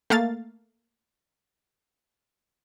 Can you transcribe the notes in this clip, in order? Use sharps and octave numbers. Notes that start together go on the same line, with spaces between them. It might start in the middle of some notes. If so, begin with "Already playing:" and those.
A3 A#3 F5 A6